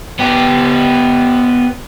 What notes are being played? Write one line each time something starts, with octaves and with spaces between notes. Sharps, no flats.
B3 G4